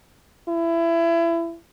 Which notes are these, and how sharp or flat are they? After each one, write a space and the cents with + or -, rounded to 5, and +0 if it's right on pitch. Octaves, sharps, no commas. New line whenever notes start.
E4 +25